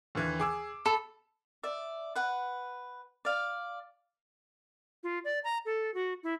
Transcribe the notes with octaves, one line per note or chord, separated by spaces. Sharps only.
D#2 D3 E3
G#4 D6 E6
A4 A5 B5
D5 E5
B4 F#5
D5 F5
F4
D5
A#5
A4
F#4
E4